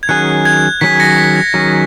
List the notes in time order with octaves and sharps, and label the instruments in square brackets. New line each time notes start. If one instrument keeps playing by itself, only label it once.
[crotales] G#6
[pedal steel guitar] D#3 F#3 C#4 G#4 [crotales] F#6
[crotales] G#6
[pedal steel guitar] D#3 F#3 C#4 G#4 [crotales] B6
[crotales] A#6 C#7
B6
G#6
[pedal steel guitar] D#3 F#3 C#4 G#4